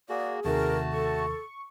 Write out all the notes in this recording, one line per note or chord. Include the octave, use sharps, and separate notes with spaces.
A#3 F#4 G#4 D5
D#2 C3 D#3 A3 F#4 A#4 A5
A4 C#6